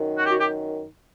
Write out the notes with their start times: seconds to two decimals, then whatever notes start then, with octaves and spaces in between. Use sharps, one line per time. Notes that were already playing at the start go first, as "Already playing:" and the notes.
Already playing: F#2 D#3
0.17 F#4
0.24 G4
0.31 F#4
0.38 G4